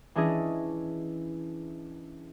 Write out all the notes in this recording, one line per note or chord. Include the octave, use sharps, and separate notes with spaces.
E3 C#4 D4 E4 G#4 D#5